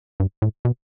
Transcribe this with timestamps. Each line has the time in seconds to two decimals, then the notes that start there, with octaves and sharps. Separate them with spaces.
0.20 G2
0.42 A2
0.65 B2